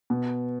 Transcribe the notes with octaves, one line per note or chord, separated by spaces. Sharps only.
B2